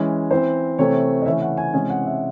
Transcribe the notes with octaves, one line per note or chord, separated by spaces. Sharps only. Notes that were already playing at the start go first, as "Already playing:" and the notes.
Already playing: E3 G#3 C#4
E3 C4 C5
C3 E3 A3 C4 C#5
D#5
C#3 E3 A3 C#4 E5
F#5
G#5
C3 E3 G#3 C#4 G#5
F#5
E5